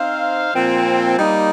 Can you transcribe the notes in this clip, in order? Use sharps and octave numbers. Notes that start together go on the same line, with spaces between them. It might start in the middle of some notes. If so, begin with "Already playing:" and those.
Already playing: C4 D#4 C5 F5
A#2 F3 C4
G3 A#3 D#4